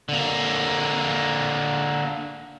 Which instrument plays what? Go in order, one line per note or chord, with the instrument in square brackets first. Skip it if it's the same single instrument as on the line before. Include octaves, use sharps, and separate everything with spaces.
[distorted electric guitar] D3 A#3